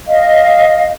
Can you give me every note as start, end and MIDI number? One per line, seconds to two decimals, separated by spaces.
0.07 0.91 75
0.07 0.91 77